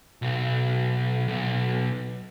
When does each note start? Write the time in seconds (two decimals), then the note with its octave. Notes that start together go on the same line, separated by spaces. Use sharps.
0.22 B1
1.28 B1